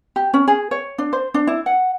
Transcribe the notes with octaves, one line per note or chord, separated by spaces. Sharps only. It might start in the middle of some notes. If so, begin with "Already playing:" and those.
G4
C#4
G#4
C#5
D4
C5
D4
E4
F#5